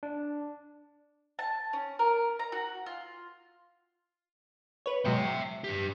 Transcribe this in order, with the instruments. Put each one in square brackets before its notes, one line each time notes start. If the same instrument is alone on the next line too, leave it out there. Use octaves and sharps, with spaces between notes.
[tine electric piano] D4
[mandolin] A5
C#4
A#4
A#5
F#4
F4
[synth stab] B4 C#5
[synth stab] B2 F#3 G#3 [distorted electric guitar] E5 G5
[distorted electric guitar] D4 G4